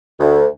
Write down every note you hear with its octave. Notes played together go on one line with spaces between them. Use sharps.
D2